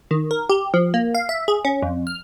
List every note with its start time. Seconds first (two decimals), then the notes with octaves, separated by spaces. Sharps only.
0.11 D#3
0.31 A#4
0.49 G4
0.74 F3
0.94 A#3
1.15 F5
1.29 E5
1.48 G#4
1.65 C#4
1.82 F2
2.07 F6